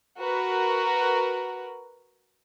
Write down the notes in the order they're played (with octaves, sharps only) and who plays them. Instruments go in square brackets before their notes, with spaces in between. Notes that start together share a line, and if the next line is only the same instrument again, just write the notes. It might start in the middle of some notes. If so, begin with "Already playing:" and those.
[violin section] F#4 A#4 B4